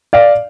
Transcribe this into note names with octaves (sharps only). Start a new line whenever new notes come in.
D5 F5